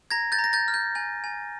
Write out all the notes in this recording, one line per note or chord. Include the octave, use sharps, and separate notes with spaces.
A#5 G#6 A#6
G6 A6
A#5
A#6
G6 A6
F6
G6
G#5 G6
G#5